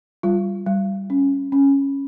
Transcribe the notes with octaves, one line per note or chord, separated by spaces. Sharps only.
G3 F4
G3
C#4
C#4